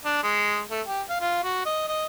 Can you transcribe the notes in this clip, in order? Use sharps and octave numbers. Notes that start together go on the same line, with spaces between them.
D4
G#3
A3
G4
F5
F4
F#4
D#5
D#5